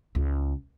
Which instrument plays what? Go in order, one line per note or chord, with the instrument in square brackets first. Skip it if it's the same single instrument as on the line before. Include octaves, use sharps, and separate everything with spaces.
[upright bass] C#2